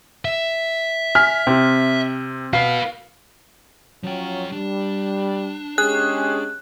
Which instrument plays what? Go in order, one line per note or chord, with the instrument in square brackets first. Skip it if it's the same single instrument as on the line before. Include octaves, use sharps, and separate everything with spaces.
[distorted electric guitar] E5
[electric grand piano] G#5 [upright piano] F6 B6
[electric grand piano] C3 [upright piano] C4
[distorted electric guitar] F#4 B4 [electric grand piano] F5 [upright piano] C7
[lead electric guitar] F3 G5 [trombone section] F#3 C#4 F4
[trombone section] G3 [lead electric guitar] D4
[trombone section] G#3 C#4 G4 [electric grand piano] G#4 [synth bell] F#6